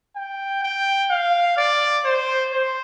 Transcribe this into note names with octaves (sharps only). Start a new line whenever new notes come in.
G5
G5
F5
D5
C5
C5